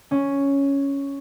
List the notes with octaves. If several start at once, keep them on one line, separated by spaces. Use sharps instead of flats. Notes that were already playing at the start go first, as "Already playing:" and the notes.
C#4